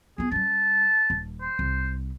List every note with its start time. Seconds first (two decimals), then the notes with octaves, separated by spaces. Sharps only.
0.18 B3 F4 G#4
0.31 G3 C#4 A5
1.10 D#1
1.41 C5
1.59 C2